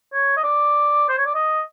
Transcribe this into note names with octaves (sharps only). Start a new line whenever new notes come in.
C#5
D#5
D5
C5
C#5
D5
D#5